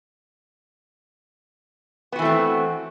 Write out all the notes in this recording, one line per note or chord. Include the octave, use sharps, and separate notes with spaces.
E3 A3 B3 C4 F#4